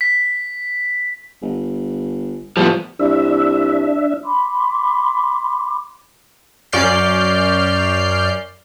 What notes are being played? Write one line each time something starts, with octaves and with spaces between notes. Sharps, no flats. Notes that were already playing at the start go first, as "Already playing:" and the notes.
B6
G1
A2 F3 G3 A3 B3
C2 D4 E5
B5 C6 D6
F#2 C#4 D5 F6 G6 C7